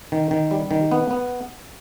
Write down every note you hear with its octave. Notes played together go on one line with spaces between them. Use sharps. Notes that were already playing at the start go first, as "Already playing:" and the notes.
D#3
D#3
G3
D#3
B3
B3